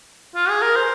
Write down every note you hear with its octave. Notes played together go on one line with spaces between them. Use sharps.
F4
G#4
A#4
C5